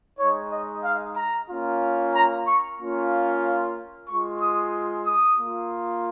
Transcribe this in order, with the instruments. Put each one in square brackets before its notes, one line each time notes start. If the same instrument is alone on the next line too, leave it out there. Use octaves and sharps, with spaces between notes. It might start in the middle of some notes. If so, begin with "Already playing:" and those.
[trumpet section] G#3 D#4 C#5
D#5
F5
A#5
A#3 C#4 F4
A#5
C#6
A#3 C#4 F4
G#3 F4 C#6
D#6
D#6
A#3 F4